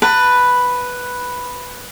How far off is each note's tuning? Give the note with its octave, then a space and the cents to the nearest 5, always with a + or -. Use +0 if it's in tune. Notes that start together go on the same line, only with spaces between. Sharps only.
B4 +0 A5 +30